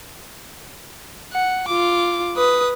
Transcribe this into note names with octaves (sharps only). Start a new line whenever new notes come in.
F#5
F4 D6
B4 D#6